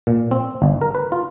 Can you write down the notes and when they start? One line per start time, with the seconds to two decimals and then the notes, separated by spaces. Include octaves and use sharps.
0.07 A#2
0.31 C4
0.62 G1
0.81 A#4
0.95 B4
1.12 F4